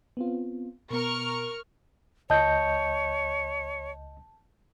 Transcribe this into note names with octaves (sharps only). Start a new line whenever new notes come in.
B3 C4 F4
B2 B3 A#4 C#6 F6
C#2 C#5 D#5 A5 G6